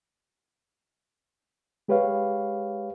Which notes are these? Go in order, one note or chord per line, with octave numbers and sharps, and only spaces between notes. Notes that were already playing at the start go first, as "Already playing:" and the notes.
G#3 G4 B4 C#5 F5